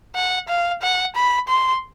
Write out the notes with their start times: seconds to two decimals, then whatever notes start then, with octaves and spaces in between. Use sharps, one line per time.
0.15 F#5
0.48 F5
0.82 F#5
1.16 B5
1.48 C6